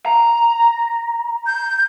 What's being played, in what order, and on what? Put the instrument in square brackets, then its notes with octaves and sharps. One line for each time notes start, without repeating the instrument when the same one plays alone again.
[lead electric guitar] A#5
[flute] G6